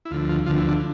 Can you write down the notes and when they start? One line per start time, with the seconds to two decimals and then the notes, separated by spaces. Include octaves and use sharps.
0.05 E4
0.11 D2 F4
0.14 D3 F3
0.29 F4
0.46 D2 D3 F3 F4
0.58 E4
0.68 D4